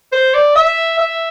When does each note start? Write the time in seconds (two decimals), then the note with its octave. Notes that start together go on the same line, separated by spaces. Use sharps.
0.12 C5
0.34 D5
0.55 E5
0.98 E5